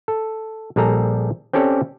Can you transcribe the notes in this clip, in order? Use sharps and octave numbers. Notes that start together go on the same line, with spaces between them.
A4
A#1 G3 G#4 A4 A#5
C4 C#4 G4 A4 C#5 D5